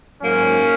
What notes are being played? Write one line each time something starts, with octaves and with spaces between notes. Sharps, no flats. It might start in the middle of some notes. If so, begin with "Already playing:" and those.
G#2 F#3 A#3 C#4